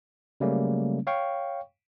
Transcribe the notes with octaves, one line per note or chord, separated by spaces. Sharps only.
C#3 F#3 G3 A3 A#3 C#4
C#5 F5 G5 C#6